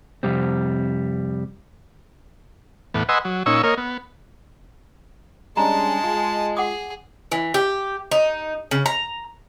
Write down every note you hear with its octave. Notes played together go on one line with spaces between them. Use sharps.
F2 C3 G3 C4
E2 A2 B3
B4 D#5 F#5 G#5 C6 E6
F#3
A#2 C#4 D#4 C#6 E6
A#3 A#4 C#5 D#5
B3
G3 G#3 C#4 D4 A5 A#5
F4
G#4 F#5 D6 D#6
E3
G4
D#4
C#3
A#5